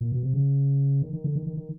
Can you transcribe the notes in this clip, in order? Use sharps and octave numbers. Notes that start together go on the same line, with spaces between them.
A#2
B2
C3
C#3
D#3
D#3
D3
D#3
D#3
D#3